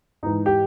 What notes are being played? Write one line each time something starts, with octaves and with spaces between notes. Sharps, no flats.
G#2 E3 D#4
G4